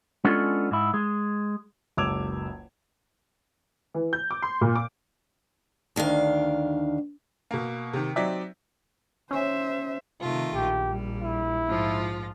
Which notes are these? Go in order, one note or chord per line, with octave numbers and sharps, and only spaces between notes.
G#3 B3 C#4 D4 F4 A4
G#2 E4
G#3
F#1 C#2 D6 E6 G#6 F7
E3
G6
D6
C6
A#2
D6
D2 D#3 D4 F5
B2 A#3
C3 D#3
F#3 C4 D#4 G4 D5 E5
C#4 C5 E5
C3 D#3 A3 F4
A#1 G4
G3
E4
G#2 F3 F4